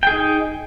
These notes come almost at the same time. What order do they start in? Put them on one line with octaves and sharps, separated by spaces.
G5 G#4 D#4